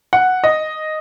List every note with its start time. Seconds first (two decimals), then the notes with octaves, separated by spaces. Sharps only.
0.13 F#5
0.44 D#5